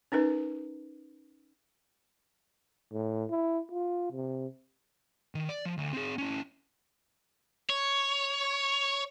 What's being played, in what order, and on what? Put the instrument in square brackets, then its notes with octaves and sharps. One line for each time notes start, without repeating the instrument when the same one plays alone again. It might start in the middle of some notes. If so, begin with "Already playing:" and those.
[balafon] C#4 D#4 A#4 B4
[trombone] A2
E4
F4
C3
[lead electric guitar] D#3
D5
F3
D2
C4 G#4
C#4 E4
[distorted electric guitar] C#5